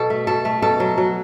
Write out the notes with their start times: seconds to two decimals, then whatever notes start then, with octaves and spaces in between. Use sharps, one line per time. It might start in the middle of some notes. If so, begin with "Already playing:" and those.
Already playing: B2 A4
0.10 A3
0.27 B2 A4
0.45 A3
0.62 B2 A4
0.80 F#3
0.98 F#3